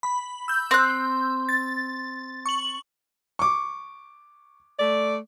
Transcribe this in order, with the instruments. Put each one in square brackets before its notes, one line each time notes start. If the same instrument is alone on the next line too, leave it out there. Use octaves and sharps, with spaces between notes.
[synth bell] B5
E6 G6
[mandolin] C4 F#6
[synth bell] A6
C#6 F#7
[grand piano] C#6 D6
[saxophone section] A3 D5